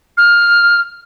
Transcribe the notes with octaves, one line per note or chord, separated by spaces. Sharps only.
F6